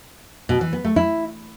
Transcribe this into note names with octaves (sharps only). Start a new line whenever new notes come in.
B2
E3
B3
A3
E4